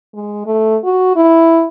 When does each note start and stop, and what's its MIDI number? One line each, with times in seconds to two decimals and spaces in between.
0.15 0.44 56
0.46 0.76 57
0.84 1.14 66
1.16 1.66 64